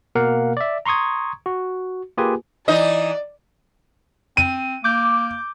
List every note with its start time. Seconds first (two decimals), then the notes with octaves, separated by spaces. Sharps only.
0.15 B2 A#3 A#4 F5 F#5
0.57 D5 E5
0.86 A#5 C6 C#6 D#6 G#6
1.46 F#4
2.18 A#3 F4 G4 G#4 B4 G#5
2.68 E3 D#4 D5 D#5
4.37 C4 D#7
4.84 A#3 D6 G6